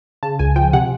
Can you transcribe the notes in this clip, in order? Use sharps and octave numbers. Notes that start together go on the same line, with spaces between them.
C#3 A5
C#2 G#5
F3 G5
C3 F#5